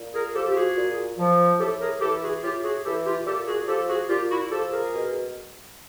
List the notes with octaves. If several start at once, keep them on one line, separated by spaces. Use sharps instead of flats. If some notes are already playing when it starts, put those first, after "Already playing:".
Already playing: A#2
G#4 A#4
F3 G4 A4
G4
F#4 G#4
A#2
F3
A2 G4 A4
G#4 A#4
E3 G4 A4
F#4 G#4
A2 F4 G4
F#4 G#4
E3 G4 A4
F4 G4
A#2 G4 A4
F#4 G#4
F3 G4 A4
F#4 G#4
A#2 F4 G4
E4 F#4
F3 G4 A4
G#4 A#4
B2